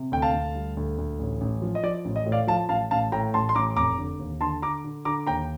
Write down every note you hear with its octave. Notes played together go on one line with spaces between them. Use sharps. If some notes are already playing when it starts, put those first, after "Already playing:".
Already playing: C3
D2 G5
F5 A5
D2
G3
D2
D2
A1
A1
F3
D#5
F3 D5
A1
D#5
A2
D5 F5
F3 F5 A5
A1 F5 A5
A1 F5 A5
A2 G5 A#5
A1 A5 C6
C6
A1 A#5 D6
F1 A#5 D6
D3
D#2
D3 A5 C6
D3 A#5 D6
D3
D3 A#5 D6
D#2 G5 A#5